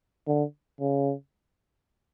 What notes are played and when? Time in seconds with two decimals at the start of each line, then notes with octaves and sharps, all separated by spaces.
0.28 D3
0.81 C#3